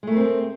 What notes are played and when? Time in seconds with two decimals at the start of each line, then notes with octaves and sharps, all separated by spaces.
0.03 G#3
0.07 A3
0.12 A#4
0.17 C4